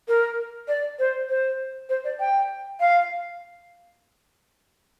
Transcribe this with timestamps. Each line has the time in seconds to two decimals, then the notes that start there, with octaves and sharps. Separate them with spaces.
0.08 A#4
0.68 D5
0.99 C5
1.29 C5
1.89 C5
2.04 D5
2.20 G5
2.80 F5